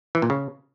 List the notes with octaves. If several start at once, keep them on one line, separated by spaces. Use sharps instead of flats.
E3
A#2
C#3